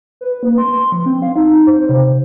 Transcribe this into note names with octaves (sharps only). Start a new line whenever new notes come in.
B4
A#3
C6
F3
C4
F5
D#4
C5
C3